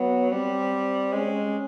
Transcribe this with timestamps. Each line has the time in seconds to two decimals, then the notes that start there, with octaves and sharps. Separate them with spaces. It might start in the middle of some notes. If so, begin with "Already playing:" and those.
Already playing: F#3 B3
0.31 G3 C4
1.13 G#3 C#4